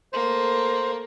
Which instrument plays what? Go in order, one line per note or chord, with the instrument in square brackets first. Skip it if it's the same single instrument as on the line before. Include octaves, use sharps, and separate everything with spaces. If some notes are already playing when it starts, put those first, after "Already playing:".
[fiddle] A3 A#3 [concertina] C5